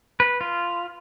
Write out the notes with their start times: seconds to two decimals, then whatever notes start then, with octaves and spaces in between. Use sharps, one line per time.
0.20 B4
0.41 F4